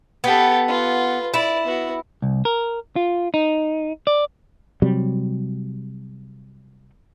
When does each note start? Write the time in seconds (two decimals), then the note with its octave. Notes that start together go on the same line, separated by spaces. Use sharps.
0.24 B3 G4 A4
0.68 F4 B4
1.34 E4 D5
1.64 B3 F#4
2.22 C2
2.45 A#4
2.96 F4
3.34 D#4
4.07 D5
4.82 C3 F#3 G3